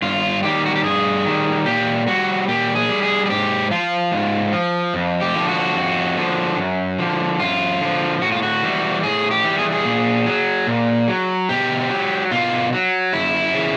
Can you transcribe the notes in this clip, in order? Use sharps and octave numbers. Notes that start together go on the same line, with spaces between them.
G2 F4
D#3 G3 G4
F#4
G4
G2 G#4
D#3 G3
A#2 G4
G3 F#4
A#2 G4
G#4
G3
G#4
G#4
G#2 G4
F3 F4
G#2
F3
F2
G4
D3 F3
F#4
F2
D3 F3
F#2
D3 F3
F#2 F4
D3 F3
A2 F#4
F4
F#4
E3 G3
A2 G#4
G4
E3 G3
G#4
G#4
A#2
F#3
A#2
F#3
B2 G4
F#3
B2 F4
F#3
F#2 E4
C#3 E3